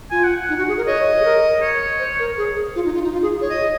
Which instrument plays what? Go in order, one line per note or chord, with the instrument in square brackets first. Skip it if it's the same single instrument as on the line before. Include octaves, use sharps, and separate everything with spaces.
[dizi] F4 [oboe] G#5
[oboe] F#5
F#5
[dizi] D#4
F#4
G#4
A#4
[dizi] C#5 [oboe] D#5
[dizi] G#4
A#4
[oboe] C#5
[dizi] C5
A#4
G#4
F4
D#4
F4
D#4
F4
G#4
C#5
[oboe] D#5